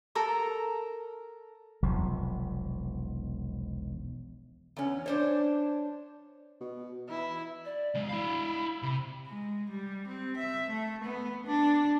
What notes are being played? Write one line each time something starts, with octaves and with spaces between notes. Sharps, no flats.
A4 A#4 A#5
E1 B1 C3 F3
E2 C#4
D4 C5 C#5
B2
E3 E4
D5
E2 G#3
E4 F5 B5
C3
G#3
G3
C4
E5
A3
B3
D4